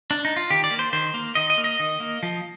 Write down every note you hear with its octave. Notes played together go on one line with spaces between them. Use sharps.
D4
D#4
F4
D#3 G4
D5
A#3
C5
D#3 C5
A#3
D#3 D#5
D#5
A#3
D#5
D#3
A#3
F3